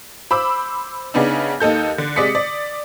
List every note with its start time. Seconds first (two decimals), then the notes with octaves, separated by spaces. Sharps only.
0.31 C5 B5 D6 E6
1.14 C#3 B3 D4 D#4
1.60 D#2 D#4 A4 G6
1.98 D3
2.16 C3 G#3 D5 D#6 B6 C#7
2.35 D5